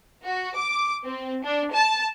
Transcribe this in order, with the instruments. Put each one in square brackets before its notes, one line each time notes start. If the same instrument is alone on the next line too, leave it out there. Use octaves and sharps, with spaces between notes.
[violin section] F#4
D6
C4
D4
A5